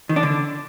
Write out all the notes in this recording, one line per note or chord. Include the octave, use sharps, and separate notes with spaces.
D#3
D4
D3